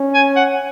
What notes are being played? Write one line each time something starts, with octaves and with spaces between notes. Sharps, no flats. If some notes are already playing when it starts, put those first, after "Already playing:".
Already playing: C#4
G#5
F#5